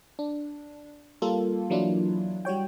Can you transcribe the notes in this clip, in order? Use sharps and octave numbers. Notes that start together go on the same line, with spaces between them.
D4
G3 A#3 F4 A4
E3 F#3 A#3 D4 E4 F4
G3 F#4 C#5 G5